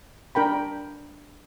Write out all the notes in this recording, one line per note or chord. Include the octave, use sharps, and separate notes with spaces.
D4 A#4 G5 B5